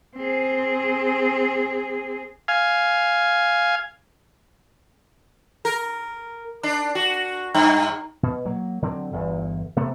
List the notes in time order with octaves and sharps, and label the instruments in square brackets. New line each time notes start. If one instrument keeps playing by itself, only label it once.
[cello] C4 G#4
[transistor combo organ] F5 G#5
[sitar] A#4
D4
F#4
G2
[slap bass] B2
F#3 A#3
D3 F#3 C4
G1 E2
C3 A3 B3